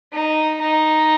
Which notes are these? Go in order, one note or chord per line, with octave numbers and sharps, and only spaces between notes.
D#4
D#4